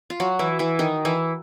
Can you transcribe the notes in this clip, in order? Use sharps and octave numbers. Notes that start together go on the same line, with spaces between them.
F4
F#3 F#4
E3 E4
E3 E4
D#3 D#4
E3 E4